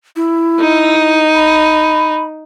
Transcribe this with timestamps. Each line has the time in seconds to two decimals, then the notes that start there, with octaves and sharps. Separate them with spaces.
0.16 E4
0.60 D#4
1.34 B5